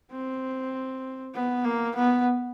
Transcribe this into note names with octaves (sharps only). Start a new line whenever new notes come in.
C4
B3
A#3
B3